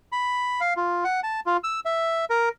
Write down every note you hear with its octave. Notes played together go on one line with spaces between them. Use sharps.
B5
F5
F4
F#5
A5
F4
E6
E5
A#4